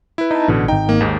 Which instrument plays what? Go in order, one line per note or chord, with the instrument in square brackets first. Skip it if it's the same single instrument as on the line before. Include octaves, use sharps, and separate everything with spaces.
[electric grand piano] E4 B4
[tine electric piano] D#4 A5
[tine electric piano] A1 [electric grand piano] B2 D3
[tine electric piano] G#1 D#4 [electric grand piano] G5
[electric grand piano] A#3
D#2 G#2 D#3